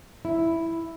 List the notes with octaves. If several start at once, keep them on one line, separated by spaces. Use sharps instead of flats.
E4